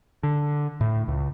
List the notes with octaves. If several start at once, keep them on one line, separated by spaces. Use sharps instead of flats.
D3
A2
C#2